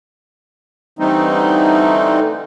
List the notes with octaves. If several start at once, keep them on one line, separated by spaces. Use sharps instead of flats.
D3 E3 G3 A3 C4 D#4